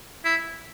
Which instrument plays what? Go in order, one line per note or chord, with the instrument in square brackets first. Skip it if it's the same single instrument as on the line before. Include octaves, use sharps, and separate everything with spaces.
[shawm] E4